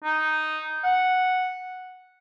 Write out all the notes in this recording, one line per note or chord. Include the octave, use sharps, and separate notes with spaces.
D#4
F#5